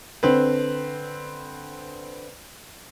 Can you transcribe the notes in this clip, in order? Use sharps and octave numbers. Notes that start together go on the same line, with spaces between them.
D3 C4 B4